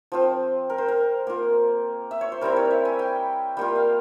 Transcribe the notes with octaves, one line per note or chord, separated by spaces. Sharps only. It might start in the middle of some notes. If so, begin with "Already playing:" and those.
F3 C4 F4
A#4
C5
A#4
A#3 F4
E5
C#5
C5
G3 C4 E4 A#4
C#5
E5
G#5
G5
G3 A#3 F4 G5
F5